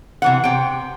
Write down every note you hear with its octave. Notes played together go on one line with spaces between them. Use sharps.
C3 E3 F#5
C3 G5